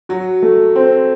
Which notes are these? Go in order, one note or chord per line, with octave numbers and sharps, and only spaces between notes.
F#3 F#4
A3
C4